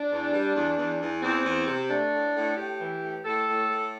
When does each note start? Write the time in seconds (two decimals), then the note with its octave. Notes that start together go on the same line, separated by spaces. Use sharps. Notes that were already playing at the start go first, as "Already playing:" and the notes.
Already playing: D4
0.12 E2
0.33 G3
0.56 E2
0.78 E2
1.01 E2
1.22 E2 C4
1.46 E2
1.68 C3
1.90 A3 D4
2.13 A2
2.35 A2
2.57 A2 G4
2.80 E3
3.02 A2
3.24 A2 A4
3.47 A2
3.69 A2